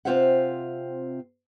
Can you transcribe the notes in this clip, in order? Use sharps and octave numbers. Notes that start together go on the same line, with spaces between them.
C3 C4 F4 C5 E5 F#5